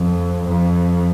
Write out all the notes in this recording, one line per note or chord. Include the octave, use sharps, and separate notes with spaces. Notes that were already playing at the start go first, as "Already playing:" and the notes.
Already playing: F2
F2